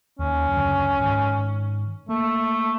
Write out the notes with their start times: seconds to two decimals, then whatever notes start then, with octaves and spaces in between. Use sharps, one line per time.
0.19 D#2 D#3 C#4
0.48 C#2 F#2 D3
1.00 G#2 D#3
2.09 A3 A#3